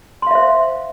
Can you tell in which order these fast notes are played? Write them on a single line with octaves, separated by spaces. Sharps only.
C6 F5 E5 C5